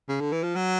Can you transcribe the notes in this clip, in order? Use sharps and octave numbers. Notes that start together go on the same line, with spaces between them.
C#3
D3
E3
F3
F#3